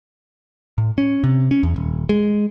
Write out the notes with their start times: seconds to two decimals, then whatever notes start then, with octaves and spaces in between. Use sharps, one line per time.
0.78 A2
0.98 C#4
1.24 C3
1.51 C#4
1.63 E2
1.76 D#1
2.09 G#3